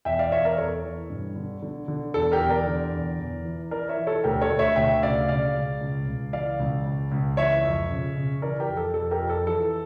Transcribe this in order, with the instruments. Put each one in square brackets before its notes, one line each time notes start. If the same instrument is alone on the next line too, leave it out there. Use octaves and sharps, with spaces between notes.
[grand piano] E2 E5 G5
D5 F5
E2 C#5 E5
A#4 D5
E2 A4 C#5
E3
G2
D3
D3
D3
E2 A4
G4 A#4
E2
A#4 D5
D3
E2
E2
E3
E3 A#4 D5
C#5 E5
E3
A4 C#5
D2 G4 A#4
A4 C#5
D2
C#5 E5
D2 E5 G5
C#3 D5 F5
C#3 D5 F5
C#2
C#2
C#2
E3 D5 F5
C#2
C#2
C#2
E3 C#5 E5
F2
C#3
C#3
E3 A#4 D5
G4 A#4
F2
A4
F2 A4
G4 A#4
F2
A4
E3 A4